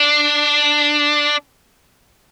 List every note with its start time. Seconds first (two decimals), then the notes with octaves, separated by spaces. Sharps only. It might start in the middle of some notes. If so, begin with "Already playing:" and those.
Already playing: D4